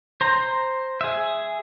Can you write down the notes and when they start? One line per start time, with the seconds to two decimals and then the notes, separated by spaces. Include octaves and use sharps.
0.21 C5 A#5
1.01 G#4 E5